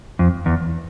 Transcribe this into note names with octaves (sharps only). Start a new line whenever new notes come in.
F2
E2